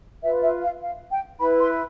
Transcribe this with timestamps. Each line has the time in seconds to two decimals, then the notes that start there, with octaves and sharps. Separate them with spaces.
0.23 F4 B4 E5
0.42 E5
0.62 F5
0.81 F5
1.11 G5
1.40 E4 B4 B5
1.60 C6